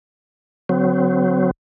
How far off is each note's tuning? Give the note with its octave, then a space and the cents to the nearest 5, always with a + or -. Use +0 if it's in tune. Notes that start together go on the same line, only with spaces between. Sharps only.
D3 -45 F#3 +0 C4 -35